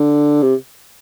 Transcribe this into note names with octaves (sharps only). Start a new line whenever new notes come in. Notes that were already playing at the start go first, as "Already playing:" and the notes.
Already playing: D3
C3